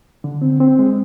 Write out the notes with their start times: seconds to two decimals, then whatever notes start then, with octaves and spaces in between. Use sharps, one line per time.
0.24 D3
0.41 C4
0.60 C4
0.79 G#3